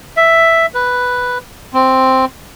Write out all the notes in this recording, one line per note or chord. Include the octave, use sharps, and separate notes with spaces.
E5
B4
C4